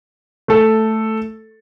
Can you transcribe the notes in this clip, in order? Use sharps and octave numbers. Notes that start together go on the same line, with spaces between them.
A3 A4